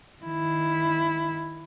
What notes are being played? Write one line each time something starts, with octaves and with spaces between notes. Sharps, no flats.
D#3 E4